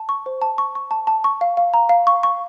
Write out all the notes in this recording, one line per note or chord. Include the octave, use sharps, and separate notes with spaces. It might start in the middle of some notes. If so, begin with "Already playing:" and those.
Already playing: A5
C#6
C5
A5
C#6
C#6
A5
A5
C#6
F5
F5
A#5
F5
C#6
C#6